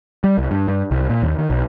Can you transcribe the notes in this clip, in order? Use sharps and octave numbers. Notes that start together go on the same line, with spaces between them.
G3
C2
G2
G2
C2
A#2
D#2
D#3
B1